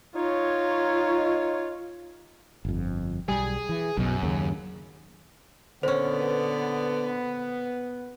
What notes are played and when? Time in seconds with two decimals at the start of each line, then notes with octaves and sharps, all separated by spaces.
0.16 D#4 F4 C#5
2.65 G1 F2
3.28 B1 G3 G#4
3.69 E3
3.97 B1 F#2 B2
4.23 D#2 C#3
5.83 A#2 D3 B3 C#4 C5